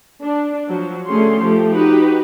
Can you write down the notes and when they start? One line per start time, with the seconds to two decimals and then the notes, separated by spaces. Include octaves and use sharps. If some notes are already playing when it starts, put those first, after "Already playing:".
0.22 D4
0.67 F3 F#3
1.07 D3 A3 C#4 G#4 C6
1.38 F3 A3 G4
1.73 D#4 F#4 G4 B4